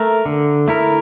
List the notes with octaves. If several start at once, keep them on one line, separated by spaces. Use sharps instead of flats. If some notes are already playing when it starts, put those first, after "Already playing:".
Already playing: A3 A#4
D3
A3 E4 A#4